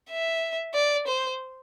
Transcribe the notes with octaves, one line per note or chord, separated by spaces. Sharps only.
E5
D5
C5